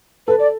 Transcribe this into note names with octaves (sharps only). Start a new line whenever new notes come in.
A4 B4
D5